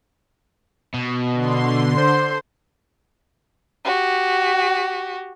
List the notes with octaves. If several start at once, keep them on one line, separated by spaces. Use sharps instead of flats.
B2
D3 C6
C5
F#4 G4